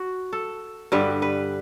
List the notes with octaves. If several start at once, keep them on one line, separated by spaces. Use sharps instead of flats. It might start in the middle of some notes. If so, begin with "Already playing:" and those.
Already playing: F#4
A4
G2 D3 G3 B4
B4